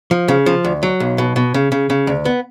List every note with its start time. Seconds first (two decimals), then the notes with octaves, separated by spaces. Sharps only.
0.11 F3
0.28 C#3
0.46 F3
0.65 D2
0.83 F#3
1.00 B1
1.18 B2
1.36 B2
1.54 C#3
1.72 C#3
1.90 C#3
2.07 D2
2.25 B3